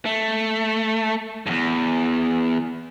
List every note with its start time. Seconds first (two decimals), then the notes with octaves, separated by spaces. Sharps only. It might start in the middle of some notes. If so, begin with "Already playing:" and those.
0.05 A3
1.46 E2 G2